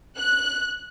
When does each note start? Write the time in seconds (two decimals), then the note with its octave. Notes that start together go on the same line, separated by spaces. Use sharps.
0.18 F#6